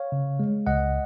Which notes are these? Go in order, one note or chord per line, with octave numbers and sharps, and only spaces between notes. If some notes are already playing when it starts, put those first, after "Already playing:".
Already playing: C#5 F5
C#3
G#3
C#2 D#5 F#5